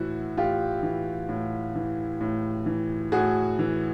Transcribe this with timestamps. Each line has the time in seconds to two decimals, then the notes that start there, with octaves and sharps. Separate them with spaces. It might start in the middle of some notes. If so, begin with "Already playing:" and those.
Already playing: A2 E3 E4 F#4
0.37 A2 F4 G4
0.83 E3
1.29 A2
1.75 E3
2.21 A2
2.66 E3
3.12 A2 F#4 G#4
3.59 E3